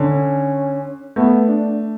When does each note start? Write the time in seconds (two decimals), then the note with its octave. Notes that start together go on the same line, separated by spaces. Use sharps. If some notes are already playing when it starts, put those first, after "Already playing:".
Already playing: D3 C#4
1.16 A3 B3
1.48 D4